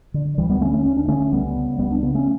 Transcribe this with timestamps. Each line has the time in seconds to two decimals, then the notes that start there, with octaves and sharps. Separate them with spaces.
0.14 D3
0.38 D2 E3 G3
0.49 G3 B3
0.61 D3 A3 C#4
0.74 A3 C#4
0.85 D2 C#4
0.97 D4
1.08 D3 A3 C#4
1.32 C#2 G3 B3
1.56 C#3
1.79 C#2 G3 B3
1.91 B3 D4
2.02 C#3 B3 D4
2.15 A3 C#4